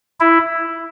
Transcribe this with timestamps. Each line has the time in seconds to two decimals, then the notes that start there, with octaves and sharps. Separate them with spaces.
0.20 E4